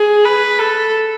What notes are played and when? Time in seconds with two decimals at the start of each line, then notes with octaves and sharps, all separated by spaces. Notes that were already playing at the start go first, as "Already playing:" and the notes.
Already playing: G#4
0.25 B4
0.59 A4